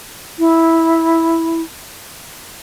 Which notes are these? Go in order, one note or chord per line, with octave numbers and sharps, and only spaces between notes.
E4